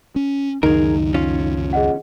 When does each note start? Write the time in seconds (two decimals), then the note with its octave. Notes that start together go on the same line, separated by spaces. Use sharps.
0.16 C#4
0.63 C#2 F#2 D#3 D#4 G#4 A#4
1.14 C#4 F4
1.73 G#4 D#5 F#5